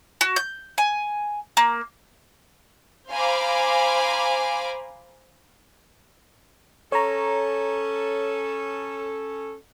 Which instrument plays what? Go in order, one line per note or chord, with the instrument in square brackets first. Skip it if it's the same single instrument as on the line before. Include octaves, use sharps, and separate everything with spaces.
[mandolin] F#4
G6
G#5
A#3
[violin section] C5 F5 G#5 A#5 B5 D6
[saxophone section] C#4 A4 [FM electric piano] C#5 A#5